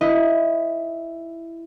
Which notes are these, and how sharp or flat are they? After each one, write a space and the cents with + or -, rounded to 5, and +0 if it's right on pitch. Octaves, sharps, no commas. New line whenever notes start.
E4 +10 B4 +0 D#5 +0